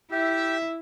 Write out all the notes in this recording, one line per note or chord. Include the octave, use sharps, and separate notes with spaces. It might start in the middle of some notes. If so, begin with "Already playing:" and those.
E4 G4 E5